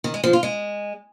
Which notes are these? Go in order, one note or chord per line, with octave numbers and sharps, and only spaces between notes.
D#3
G#3
F3
F4
G#3